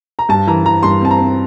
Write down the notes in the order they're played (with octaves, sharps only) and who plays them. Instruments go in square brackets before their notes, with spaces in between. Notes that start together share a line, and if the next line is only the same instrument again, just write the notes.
[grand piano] A#5
G2 A5
E3 A#5
E3 A#5
G2 C6
C4 A5
A#5
C4